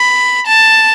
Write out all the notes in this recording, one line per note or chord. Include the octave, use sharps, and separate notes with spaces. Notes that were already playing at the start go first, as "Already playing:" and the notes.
Already playing: B5
A5